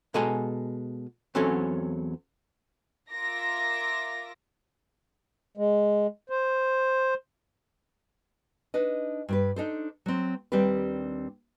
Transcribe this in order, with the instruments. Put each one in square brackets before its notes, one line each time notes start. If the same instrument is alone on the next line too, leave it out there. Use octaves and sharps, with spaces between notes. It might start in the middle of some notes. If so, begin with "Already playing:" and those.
[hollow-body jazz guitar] B2 G#3 A4 G#5 A#5
E2 F#3 C4 C#4 A4 C#5
[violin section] F4 A#4 E5 D6 A#6
[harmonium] G#3
C5
[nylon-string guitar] D4 D#4 B4 D#5
G2 G4 B4
D4 D#4 A4 C5
F#3 C4
D#2 G3 C4 D4 G4 B4